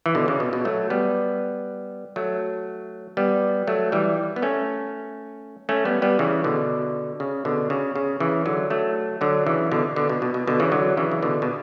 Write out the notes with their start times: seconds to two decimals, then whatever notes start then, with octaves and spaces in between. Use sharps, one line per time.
0.06 E3
0.15 B2 D3
0.28 C#3
0.40 B2
0.53 B2
0.65 F#3 A3
0.90 G3 B3
2.16 F#3 A3
3.17 G3 B3
3.67 F#3 A3
3.92 E3 G3
4.36 B3
4.42 A3 C#4
5.69 A3 C#4
5.85 G3 B3
6.02 G3 B3
6.19 C#3 E3
6.44 B2 D3
7.20 C#3
7.45 B2 D3
7.70 C#3
7.95 C#3
8.20 C#3 E3
8.46 D3 F#3
8.70 F#3 A3
9.21 D3 F#3
9.47 C#3 E3
9.72 B2 D3
9.96 B2 D3
10.09 B2
10.22 B2
10.34 B2
10.47 B2 D3
10.60 C#3 E3
10.72 D3 F#3
10.97 C#3 E3
11.11 C#3
11.23 B2 D3
11.42 B2